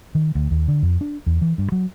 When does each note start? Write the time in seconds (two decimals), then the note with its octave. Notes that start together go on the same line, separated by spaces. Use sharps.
0.15 D#3
0.35 D2
0.51 D#2
0.68 D3
0.83 F2
1.01 D4
1.26 E2
1.41 E3
1.58 G2
1.72 F#3